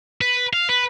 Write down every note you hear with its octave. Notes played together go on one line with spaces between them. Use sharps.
B4
F5
B4